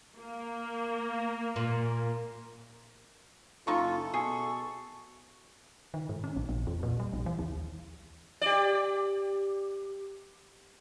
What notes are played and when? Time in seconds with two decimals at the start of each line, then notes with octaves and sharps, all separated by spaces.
0.19 A#3
1.56 A#2
3.67 F#1 E3 D#4 F4 A4 C#6
4.14 B2 G#4 C#6
5.94 D#3
6.09 G#2
6.24 C#4
6.36 A#1
6.49 A#1
6.67 E2
6.83 A#2
7.00 G3
7.13 A#1
7.26 E3
7.39 D#2
8.41 G4 D5